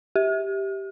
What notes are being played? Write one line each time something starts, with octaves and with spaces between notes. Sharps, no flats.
G4